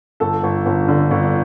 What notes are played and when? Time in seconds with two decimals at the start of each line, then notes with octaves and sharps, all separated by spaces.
0.20 G1 A4
0.43 G1
0.66 G1
0.88 D3
1.11 G1